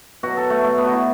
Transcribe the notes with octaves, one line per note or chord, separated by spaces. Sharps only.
B2 F#3 F#4
A4
A3
A3
B3
F#4
E4